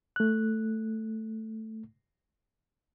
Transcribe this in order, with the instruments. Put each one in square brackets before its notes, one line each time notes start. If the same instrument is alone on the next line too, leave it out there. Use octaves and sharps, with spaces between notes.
[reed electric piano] A3 F#6